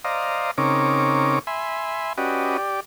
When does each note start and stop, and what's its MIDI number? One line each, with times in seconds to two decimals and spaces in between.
0.05 0.51 72
0.05 0.51 74
0.05 0.51 75
0.05 0.51 77
0.05 0.51 82
0.58 1.39 49
0.58 1.39 60
0.58 1.39 63
0.58 1.39 70
0.58 1.39 73
0.58 1.39 86
1.47 2.13 76
1.47 2.13 80
1.47 2.13 83
1.47 2.13 84
2.18 2.57 61
2.18 2.57 66
2.18 2.57 67
2.18 2.57 71
2.18 2.57 74
2.18 2.57 75
2.58 2.80 67
2.58 2.80 74